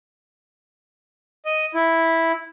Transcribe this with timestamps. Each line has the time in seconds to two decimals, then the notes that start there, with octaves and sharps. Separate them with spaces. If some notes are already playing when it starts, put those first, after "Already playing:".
1.45 D#5
1.75 E4